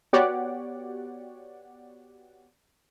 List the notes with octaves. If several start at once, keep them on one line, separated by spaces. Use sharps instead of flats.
B3 F#4 G4 C#5 D5 F#5